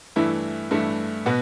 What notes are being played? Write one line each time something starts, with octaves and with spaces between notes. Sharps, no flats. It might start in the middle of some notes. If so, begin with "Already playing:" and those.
G2 E3 A3 E4
G2 E3 A3 E4
B2 B3